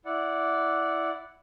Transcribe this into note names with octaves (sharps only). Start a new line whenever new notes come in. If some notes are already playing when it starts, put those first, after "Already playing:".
E4 D5 F#5